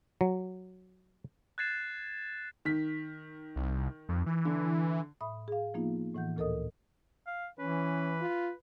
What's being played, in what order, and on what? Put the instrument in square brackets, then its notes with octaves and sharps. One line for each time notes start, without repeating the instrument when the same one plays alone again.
[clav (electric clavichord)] F#3
[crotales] F#6 G#6 A6 C7 E7
[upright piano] D#3 B6
[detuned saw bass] C2
F2
E3
[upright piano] D3
[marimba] A2 E5 B5 D#6
G#4 F5
F3 A#3 B3 D#4 F4
A2 E3 F#5 G6
D2 A#2 A4 A#4 D#5 D#6
[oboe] F5
[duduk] E3 [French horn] C#4 [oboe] B4
[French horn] F4